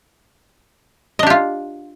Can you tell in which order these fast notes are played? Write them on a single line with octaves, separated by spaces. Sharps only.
D#5 D4 G4 F4